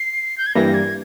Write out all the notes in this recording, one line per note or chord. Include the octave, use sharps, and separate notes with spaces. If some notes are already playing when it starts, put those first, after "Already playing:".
Already playing: C7
G6
G#6
G2 E3 G3 A#3 A#6
G#6